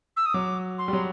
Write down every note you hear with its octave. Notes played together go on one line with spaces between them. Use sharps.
E6
D#6
F#3 D6
C6
G3
F#3